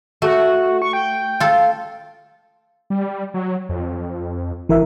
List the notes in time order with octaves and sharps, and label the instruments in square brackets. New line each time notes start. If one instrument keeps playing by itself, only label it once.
[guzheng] A3 [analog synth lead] F#4
[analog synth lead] C#6
G5
[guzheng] F4 A4
[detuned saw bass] G3
F#3
F2
[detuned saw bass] G#1 [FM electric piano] E3 A#4 E5